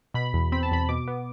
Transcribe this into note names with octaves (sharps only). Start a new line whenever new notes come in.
B2 B5
E2
C4 B5
A5
E2 B5
B2 D6
B3